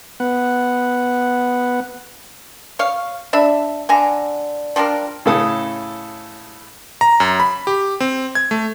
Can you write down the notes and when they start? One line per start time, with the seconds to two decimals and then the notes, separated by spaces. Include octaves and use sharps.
0.20 B3 F#5
2.79 C#5 F5
3.33 D4 E5 B5
3.89 D3 G#5 A#5
4.76 F3 G3 D4 A#4
5.25 A2 C#3 A4 D#6
7.01 A#5
7.20 F#2
7.40 B5
7.67 G4
8.00 C4
8.35 G#6
8.51 A3